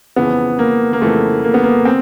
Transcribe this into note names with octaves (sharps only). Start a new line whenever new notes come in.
F2 C#3 E3 B3
A#3
A#3
F2 C#3 E3 A3
A#3
B3
A#3
C4